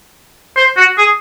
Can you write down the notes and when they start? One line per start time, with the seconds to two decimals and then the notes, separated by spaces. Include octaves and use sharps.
0.57 C5
0.77 F#4
0.98 G#4